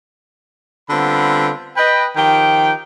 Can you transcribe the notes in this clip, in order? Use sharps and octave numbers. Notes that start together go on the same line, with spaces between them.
D3 G3 B3 C4 F4 B5
B4 D#5 G5
D#3 F3 G4 G5